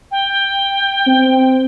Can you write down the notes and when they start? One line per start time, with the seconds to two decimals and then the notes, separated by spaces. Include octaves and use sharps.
0.11 G5
1.07 C4